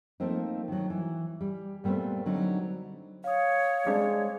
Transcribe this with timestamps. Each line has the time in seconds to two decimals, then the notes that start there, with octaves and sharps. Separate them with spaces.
0.20 F3 A3 A#3 C4 D#4
0.68 D#3 F#3
0.90 E3
1.41 G3
1.84 A#2 G3 A3 B3 C4
2.26 D3 F#3 C4 D#4
3.24 C#5 F5 D#6
3.86 G3 G#3 C4 D4